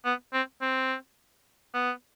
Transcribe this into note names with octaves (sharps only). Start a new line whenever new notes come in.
B3
C4
C4
B3